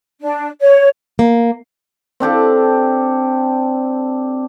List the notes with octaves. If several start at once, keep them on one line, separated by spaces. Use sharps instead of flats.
D4
C#5
A#3
C4 D4 G4 A4